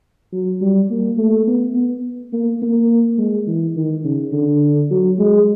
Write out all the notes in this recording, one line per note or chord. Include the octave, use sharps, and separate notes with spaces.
F#3
G3
A#3
A3
B3
B3
A#3
A#3
G#3
E3
D#3
C#3
D3
F#3
G#3